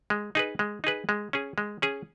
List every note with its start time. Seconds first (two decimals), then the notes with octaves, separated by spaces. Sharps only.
0.10 G#3
0.35 D#4 G#4 B4
0.59 G#3
0.84 D#4 G#4 B4
1.09 G#3
1.33 C#4 G#4
1.58 G#3
1.82 C#4 G#4